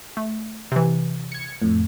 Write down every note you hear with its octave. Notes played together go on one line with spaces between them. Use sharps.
A3
C3 E3
G#6 C#7
F2 A2